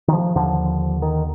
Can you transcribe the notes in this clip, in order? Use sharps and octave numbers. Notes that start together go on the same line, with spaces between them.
D#3
F3
D#2 D3 F3
D#3